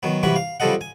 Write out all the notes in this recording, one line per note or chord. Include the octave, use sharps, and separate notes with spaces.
D#3 F#3 B3
C3 E3 G3 F#4 B4 B5
F5
C#3 F3 G3 A4 D#5 F#5
G#5